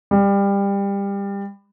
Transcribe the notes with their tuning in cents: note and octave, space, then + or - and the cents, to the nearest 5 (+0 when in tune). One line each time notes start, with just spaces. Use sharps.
G3 +25